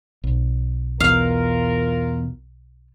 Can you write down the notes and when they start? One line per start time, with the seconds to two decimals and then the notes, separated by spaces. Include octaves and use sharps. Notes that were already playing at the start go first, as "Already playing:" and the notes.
0.24 B1
1.00 E2 B2 F4 A#4 F5